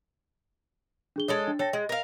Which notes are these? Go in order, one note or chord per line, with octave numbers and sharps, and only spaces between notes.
D4 G#4 G7
G#3 A4 C#5 D#5
D4
A4 C#5 G5 A#6
G#3 D#5
A#4 F5